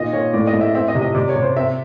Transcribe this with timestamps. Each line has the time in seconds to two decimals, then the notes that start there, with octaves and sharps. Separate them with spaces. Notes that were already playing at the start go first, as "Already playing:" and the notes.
Already playing: A#2 D#3 D#5
0.13 A#2 C#5
0.33 A2 D5
0.47 D#5
0.54 A2
0.61 E5
0.75 C4 E5
0.88 D#5
0.95 C3
1.02 D#5
1.15 C3 D5
1.29 C#5
1.36 C3
1.43 C5
1.56 C4 E5